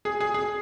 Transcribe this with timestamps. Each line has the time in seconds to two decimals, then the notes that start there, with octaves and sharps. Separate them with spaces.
0.05 G#4
0.20 G#4
0.34 G#4